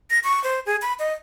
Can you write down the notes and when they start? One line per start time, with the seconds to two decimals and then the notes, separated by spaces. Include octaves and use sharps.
0.10 A#6
0.24 C#6
0.44 C5
0.66 G#4
0.82 B5
0.99 D#5